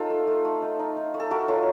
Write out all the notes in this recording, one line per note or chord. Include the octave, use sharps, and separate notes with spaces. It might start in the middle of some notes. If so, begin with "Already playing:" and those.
Already playing: D#4 F4 A4
A3
A3
A3
D#4
D#4
D#4
A3
A4
A3 F#4 A#4
F#3 F4 A4